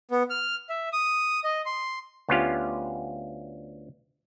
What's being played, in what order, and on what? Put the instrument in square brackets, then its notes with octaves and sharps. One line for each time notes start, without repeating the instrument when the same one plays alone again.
[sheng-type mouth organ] B3
F6
E5
D#6
D#5
C6
[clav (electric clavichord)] D2 B3 C#4 F4 G4 F5